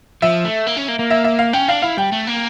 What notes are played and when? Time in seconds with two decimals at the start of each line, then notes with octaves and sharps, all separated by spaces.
0.22 F3 E5
0.44 A3
0.66 A#3
0.77 C#4
0.88 A#3
0.99 A#3
1.10 E5
1.24 E5
1.39 F5
1.53 C#4 G5
1.68 D4 F5
1.82 E4 F5
1.97 G3 G5
2.12 A3
2.27 A#3